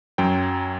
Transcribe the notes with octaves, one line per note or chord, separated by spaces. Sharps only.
F#2 F#3 G5